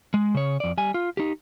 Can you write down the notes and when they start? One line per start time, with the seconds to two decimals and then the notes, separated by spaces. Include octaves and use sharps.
0.14 G#3
0.34 C#3 C#5
0.60 F2 D5
0.78 G3 G#5
0.94 F4
1.17 D#4 G4